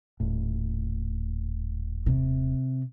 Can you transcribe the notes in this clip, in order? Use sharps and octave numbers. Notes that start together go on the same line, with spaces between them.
D#1 A2
C3